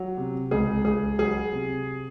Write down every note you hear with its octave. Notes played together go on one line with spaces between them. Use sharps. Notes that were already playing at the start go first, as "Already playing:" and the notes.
Already playing: F#3
C3
C#2 G#4
C#2 G#4
F#3 G#4
C3